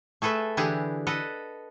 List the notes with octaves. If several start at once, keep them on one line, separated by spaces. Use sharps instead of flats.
A3 G#4 A4 B4 E5
D3 E3 E4 G4 G#4 F#5
A4 B4 D#5 F#5